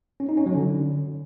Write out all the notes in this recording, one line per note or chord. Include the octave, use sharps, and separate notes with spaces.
C#4
D#4
C#4
F#3
D3